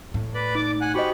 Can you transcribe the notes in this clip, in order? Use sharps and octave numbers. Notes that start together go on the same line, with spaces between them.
A2
B4 D5 B5
D#4 D5 D6
F#5 G#5 F#6
F#4 G4 C5 D#5 B5 C#6